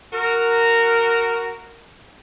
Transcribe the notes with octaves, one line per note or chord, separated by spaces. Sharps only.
F#4 A#4